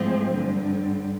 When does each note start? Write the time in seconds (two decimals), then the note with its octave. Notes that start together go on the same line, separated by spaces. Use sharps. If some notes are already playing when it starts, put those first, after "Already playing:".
Already playing: A2 F3 G#3 C4
0.30 G2 D3 G3